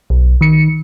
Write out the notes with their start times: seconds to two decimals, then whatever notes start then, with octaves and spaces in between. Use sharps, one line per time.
0.10 B1
0.41 D#3 C#7